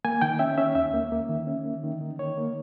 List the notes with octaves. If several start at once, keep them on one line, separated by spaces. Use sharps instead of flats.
A#3 G#5
D#3 G5
C#4 E5
C#4 E5
D#2 E5
A#3
A#3
D#3
C#4
A#3
D#3
D#3
D#3 C#5
A#3